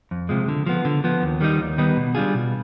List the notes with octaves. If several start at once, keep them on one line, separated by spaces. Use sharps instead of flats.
F2
C3 F3 G#3
D3
F3 B3
D3
F3 B3
D#2
D#3 G3 B3 D#4
D#2
D#3 G3 B3 D#4
B2
G3 D4 F4 G#4
B2